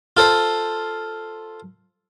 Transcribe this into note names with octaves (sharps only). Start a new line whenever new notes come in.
F4 A4 C5